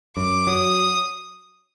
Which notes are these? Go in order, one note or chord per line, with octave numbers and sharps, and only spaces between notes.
F#2 D6
F#3 D#6